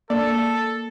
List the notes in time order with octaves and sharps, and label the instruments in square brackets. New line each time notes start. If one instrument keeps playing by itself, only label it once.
[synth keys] A#3 [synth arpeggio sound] D4 D5 [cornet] A4